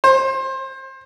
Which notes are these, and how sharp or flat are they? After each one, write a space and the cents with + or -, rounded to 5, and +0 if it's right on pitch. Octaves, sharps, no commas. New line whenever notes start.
C5 +25